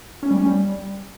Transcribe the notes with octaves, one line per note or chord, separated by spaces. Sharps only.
C#4
G3
C#4
G3